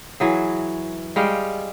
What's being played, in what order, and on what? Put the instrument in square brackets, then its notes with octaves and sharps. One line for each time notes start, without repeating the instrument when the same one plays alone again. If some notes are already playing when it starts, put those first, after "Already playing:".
[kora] E3 F#3 G#4
G3 G#3 F5 G5